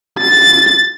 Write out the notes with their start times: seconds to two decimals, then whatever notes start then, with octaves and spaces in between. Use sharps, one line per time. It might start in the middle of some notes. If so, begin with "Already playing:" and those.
0.19 A6